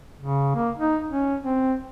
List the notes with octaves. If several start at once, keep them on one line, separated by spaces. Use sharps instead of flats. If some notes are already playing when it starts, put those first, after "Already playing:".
C#3
A#3
D#4
C#4
C4